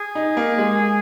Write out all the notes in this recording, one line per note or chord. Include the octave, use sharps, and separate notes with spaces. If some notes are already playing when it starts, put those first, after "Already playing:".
Already playing: G#4
D#4
A#3
G#3